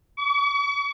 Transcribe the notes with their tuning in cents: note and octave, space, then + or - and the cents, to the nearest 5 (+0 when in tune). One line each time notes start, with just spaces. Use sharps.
C#6 +45